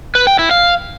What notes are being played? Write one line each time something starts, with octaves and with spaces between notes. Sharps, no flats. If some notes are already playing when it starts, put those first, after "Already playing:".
B4
G5
E4
F5